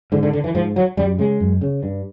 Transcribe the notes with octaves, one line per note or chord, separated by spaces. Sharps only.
G#2 D3
D3
D3
E3
G#2 F3
F#3
F#2 G3
C#3 G#3
F#2
C#3
G2